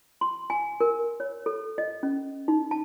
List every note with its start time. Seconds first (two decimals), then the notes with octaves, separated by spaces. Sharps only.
0.21 C6
0.50 G#5
0.81 A#4
1.20 C#5
1.46 A4
1.78 D#5
2.03 C#4
2.48 D#4
2.71 A5